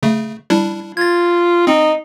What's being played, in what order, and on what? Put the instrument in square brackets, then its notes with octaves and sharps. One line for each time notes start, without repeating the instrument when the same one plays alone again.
[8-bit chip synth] C#3 A3
G3 D4 E4
[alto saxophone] F4 [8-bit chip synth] G#6 A6
[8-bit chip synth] C4 [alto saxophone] D#4